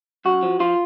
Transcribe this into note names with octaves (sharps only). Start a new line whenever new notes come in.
F#2 F#4
F3
F3 F4